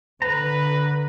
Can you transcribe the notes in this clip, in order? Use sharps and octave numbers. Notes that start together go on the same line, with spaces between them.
D3 B4 A#5